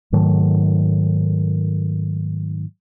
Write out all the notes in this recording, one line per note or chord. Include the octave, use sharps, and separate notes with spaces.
G#2 D#3 F#3 A3